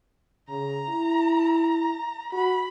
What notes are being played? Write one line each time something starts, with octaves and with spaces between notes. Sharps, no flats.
C#3 A#5
E4
F#4 B5